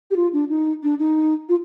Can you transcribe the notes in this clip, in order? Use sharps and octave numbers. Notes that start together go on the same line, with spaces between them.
G4
F4
D4
D#4
D4
D#4
F4